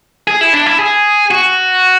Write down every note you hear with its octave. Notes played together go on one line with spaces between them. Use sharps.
G#4
E4
D4
E4
G#4
F#4